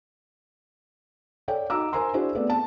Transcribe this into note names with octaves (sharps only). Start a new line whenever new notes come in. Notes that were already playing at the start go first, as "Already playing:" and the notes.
A4 C#5 D5 G5
D#4 F#4 A#5 D6 E6
A#4 C5 G#5 A#5 C6
D4 E4 F#4 G#4 C5 D5
A3 B3 C4 A4 D5
A5